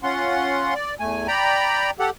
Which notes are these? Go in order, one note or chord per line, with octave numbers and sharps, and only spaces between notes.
C#4 F4 F#5 C6
D5
E2 A3 G#5
D5 G5 A#5 B5
G4 A4 F#5